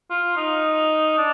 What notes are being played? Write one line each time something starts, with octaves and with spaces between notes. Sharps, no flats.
F4
D#4
D4